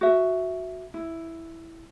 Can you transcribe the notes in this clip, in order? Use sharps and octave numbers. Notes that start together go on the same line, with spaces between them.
F#4 E5
E4